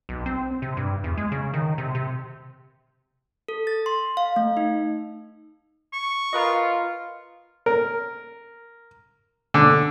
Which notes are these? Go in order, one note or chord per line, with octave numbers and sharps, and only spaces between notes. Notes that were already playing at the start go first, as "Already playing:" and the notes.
B1
C4
C3
G2
E2
G#3
C#3
D#3
C3
C3
A4
A6
C6
F5
A3
D#4
C#6
F4 A#4 B4 D#5
A#4
D3